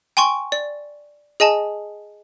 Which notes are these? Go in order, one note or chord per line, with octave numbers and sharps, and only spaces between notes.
G5 G#5 C6 C#6
D5
G#4 D#5 G#5 A5